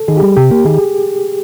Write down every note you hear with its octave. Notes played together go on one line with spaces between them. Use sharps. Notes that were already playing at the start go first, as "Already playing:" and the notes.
Already playing: A4
D#3 G#4
G4
G3
C3 G4
A#3 G4
D#3 G#4